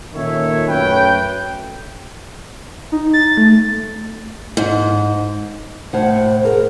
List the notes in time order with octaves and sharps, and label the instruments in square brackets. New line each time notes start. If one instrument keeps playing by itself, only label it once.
[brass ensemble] A#2 D#3 C#4 A4 C#5 E5
F#2 F#3 A3 C#4 B4 G5
[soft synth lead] D#4
A6
A3
[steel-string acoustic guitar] G#2
[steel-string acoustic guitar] A2 F#5 [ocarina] C5
[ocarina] G#4 [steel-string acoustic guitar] A#4